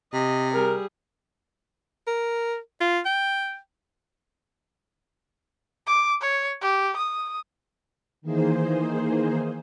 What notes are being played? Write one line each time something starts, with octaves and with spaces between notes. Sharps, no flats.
C3 D#5
G3 G#4 A#4
A#4
F4
G5
D6
C#5
G4
D#6
D#3 E3 A#3 D#4 G#4 C5